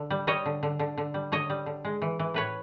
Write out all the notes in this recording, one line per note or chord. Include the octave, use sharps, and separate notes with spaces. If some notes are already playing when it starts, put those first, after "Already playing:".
Already playing: D3
G3
G3 C#5 D#5
D3
D3
D3
D3
G3
D3 C#5 D#5
G3
D3
G#3
E3
E3
A2 B4 C#5